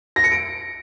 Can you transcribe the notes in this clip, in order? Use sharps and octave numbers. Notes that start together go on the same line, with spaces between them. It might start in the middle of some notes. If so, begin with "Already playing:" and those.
A#6
C#7
D7